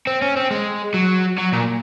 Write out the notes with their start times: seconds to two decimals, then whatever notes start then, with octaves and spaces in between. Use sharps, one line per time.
0.07 C4
0.22 C#4
0.37 C4
0.51 G#3
0.94 F#3
1.38 F#3
1.52 A#2